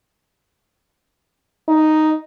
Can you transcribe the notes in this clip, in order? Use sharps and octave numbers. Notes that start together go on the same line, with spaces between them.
D#4